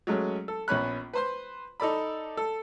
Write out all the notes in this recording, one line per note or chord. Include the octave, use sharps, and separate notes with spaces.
F#3 G#3 A3 C#4
A4
A#1 B3 C#4 C#5 B5 F#6
B4 C5 C6
D#4 A4 D5 B5
A4